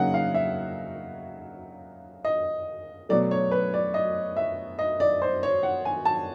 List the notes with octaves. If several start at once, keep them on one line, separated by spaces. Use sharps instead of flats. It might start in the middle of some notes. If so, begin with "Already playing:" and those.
Already playing: C#3 F#3 A#3 D#4 F#5
F5
E5
D#5
B2 F#3 A3 D5
C#5
B4
D5
D#5
E5
D#5
D5
C5
C#5
F#5
G#5
A5